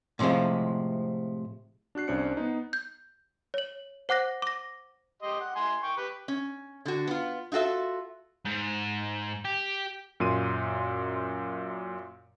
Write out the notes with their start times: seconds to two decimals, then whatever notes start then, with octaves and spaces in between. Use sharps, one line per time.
0.19 A2 C3 D#3 F3 G#3
1.95 D4 F#4 F#6 C7
2.08 C2 C#4 D4 C5 F#6 C#7
2.37 B3 D#4
2.73 G6
3.54 C#5 F#7
4.09 C5 F#5 D6 F#6 A#6
4.42 D6 A#6
5.22 G4 D#5 C6
5.41 F#5
5.56 E4 G#5 C6
5.83 G5 C#6
5.97 G4 B4
6.28 C#4
6.85 D3 F#4
7.07 B3 F4
7.52 D#4 F4 F#4 A4 E5
8.46 G#2
9.45 G4
10.20 F#2 A#2 C6 D#7